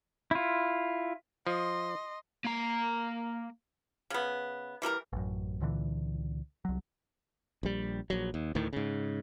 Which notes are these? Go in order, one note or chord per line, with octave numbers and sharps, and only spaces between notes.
E4 F4
F3 D#5 C6
A#3 A#5
C#3 B3
E3 G3 A4 A#4
A1 F#2
C#2 A#2 D3 E3
C2 F#3
A#1 G3
A#1 F#3
D#2
D2 A2 D#3
G#2 C#3